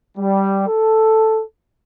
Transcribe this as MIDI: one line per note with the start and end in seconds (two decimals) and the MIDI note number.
0.18 0.64 55
0.68 1.43 69